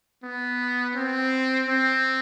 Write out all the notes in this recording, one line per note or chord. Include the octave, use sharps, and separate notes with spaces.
B3
C4
C4